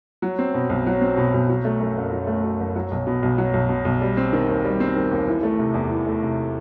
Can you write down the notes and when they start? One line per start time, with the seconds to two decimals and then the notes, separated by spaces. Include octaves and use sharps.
0.22 F#3
0.39 C4
0.54 B2
0.70 B1
0.86 F#3
1.01 C4
1.17 B2
1.34 B1
1.49 F#3
1.65 A3
1.80 F#2
1.97 F#1
2.12 F#3
2.27 A3
2.44 F#2
2.60 F#1
2.76 F#3
2.91 B1
3.07 B2
3.23 B1
3.38 F#3
3.54 B1
3.69 B2
3.85 B1
4.01 G3
4.17 C4
4.33 D#3
4.48 D#2
4.64 G3
4.80 C4
4.96 D#3
5.11 D#2
5.27 E3
5.43 A3
5.59 C3
5.74 E2
5.90 E3
6.06 A3
6.22 C3